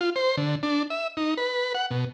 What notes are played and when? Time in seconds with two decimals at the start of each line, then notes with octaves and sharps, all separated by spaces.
0.01 F4
0.16 C5
0.37 D3
0.63 D4
0.90 E5
1.17 D#4
1.37 B4
1.75 F#5
1.91 B2